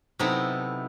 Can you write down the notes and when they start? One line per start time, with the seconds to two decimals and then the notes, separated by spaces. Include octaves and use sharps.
0.19 C3 F#3 B3 D#4 E4 A4